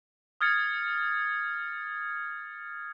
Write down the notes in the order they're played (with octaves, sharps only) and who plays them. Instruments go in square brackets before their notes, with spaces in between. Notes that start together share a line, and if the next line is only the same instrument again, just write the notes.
[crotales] D#6 F6 G#6 A6 C#7